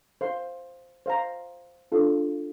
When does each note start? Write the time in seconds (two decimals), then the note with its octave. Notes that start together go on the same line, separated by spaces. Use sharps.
0.21 C5 F5 C6
1.06 C5 F5 A#5
1.92 D4 F4 A4